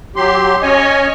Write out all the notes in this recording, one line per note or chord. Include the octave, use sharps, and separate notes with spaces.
F#3 G4 C6
C#4 C#5 D#5 G#5